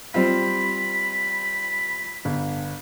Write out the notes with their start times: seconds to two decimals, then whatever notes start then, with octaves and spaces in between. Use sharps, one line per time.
0.14 G3 C4 F4 B5
2.25 G1